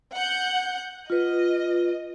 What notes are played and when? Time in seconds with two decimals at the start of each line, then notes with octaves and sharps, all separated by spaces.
0.15 F#5 G6
1.10 F4 B4 D#5